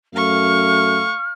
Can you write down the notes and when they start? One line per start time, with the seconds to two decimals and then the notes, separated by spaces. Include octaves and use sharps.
0.15 F#2 A3 F5 C#6 F6